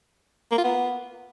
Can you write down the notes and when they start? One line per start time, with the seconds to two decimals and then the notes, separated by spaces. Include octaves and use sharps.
0.51 A#3
0.58 F4
0.64 B3